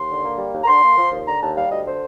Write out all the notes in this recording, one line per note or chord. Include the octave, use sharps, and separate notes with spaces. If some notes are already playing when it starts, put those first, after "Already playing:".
Already playing: D#2 C6
D3
A#3
G3
D#2
A#5
D3 C6
A#3
F3
D#2
D3 A#5
D#2 A5
G3 F5
D2 D#5
D3 C5